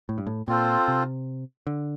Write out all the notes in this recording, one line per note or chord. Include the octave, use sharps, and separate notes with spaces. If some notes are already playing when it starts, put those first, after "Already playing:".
A2
G2
A2
A#2 C4 F4 A4 C5
C3
D3